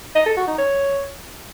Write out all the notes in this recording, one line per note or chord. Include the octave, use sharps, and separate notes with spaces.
D#5
A4
F#4
D#4
C#5